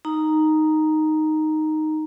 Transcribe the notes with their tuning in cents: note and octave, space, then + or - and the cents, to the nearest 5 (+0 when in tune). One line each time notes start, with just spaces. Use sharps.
D#4 +0 A#5 +0